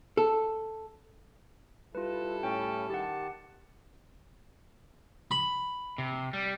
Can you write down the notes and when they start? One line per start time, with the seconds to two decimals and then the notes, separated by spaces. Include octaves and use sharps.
0.17 A4
1.95 G3 E4 F4 A4 B4
2.43 A2 C#4 G5
2.90 D#3 G4 F#5 A5
5.31 B5
5.98 C3
6.33 G3